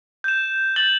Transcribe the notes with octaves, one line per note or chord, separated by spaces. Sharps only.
G6 E7
G6 A6 F#7 G7